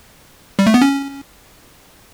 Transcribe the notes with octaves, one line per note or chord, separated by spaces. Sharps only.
G3
A3
B3
C#4